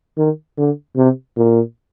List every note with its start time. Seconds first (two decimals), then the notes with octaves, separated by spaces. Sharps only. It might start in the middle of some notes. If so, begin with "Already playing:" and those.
0.17 D#3
0.58 D3
0.97 C3
1.36 A#2